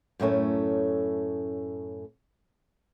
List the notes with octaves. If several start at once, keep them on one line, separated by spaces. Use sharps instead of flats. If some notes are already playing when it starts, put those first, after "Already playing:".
F#2 A2 A3 C#4